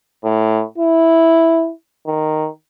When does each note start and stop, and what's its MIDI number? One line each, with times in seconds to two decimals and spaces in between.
0.24 0.63 45
0.78 1.71 64
2.07 2.48 51